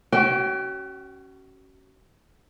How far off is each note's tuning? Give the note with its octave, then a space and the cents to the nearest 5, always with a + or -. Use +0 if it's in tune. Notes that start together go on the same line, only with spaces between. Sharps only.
C#4 +0 F#4 +35 G5 -5